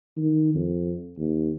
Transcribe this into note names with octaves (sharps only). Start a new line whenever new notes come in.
D#3
F2
D#2